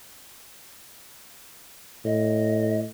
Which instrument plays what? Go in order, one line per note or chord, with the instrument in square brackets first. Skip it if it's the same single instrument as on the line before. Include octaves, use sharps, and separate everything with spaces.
[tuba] A2 [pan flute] D#5